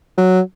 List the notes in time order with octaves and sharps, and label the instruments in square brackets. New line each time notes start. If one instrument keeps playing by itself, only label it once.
[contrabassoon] F#3